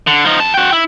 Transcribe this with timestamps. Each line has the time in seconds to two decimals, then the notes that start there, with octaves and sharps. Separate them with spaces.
0.07 D3
0.25 F3 D#4
0.40 F2 A5
0.54 F#4 G5
0.72 E4